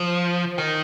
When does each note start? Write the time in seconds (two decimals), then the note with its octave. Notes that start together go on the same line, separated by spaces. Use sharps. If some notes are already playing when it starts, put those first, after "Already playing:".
Already playing: F3
0.58 D#3